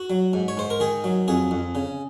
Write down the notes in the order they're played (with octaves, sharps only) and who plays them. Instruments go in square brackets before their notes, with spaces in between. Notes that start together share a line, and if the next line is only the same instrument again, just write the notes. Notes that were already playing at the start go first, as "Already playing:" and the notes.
Already playing: [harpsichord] F#4
F#3
G#2
C#5
G#2 C5
A#4
D#3 G#4
F#3
F2 G#4
F2
C#3